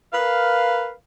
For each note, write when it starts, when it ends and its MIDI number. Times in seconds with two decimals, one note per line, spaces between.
0.13 0.91 70
0.13 0.91 71
0.13 0.91 77